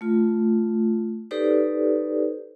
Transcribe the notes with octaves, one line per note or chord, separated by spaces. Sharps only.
A3 F4
D#4 G4 A4 B4 C5 D5